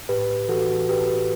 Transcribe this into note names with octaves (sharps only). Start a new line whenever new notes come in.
A2 G4 B4
E3 F#4 A4
A2 G4 B4